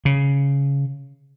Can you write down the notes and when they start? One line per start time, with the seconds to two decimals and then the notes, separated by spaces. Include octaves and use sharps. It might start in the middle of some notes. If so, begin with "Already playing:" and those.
0.05 C#3